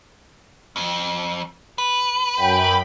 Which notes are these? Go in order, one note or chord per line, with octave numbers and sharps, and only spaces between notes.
F2
B4
F#2 G5 B5